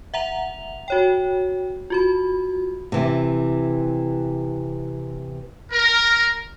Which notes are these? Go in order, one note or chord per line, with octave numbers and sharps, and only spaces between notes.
E5 F#5 A#5 F7
F#4 C#5 G5
F4 F#4 B5
C3 E3
A#4